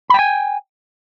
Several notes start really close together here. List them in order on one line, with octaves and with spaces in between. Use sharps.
B5 G5 G#5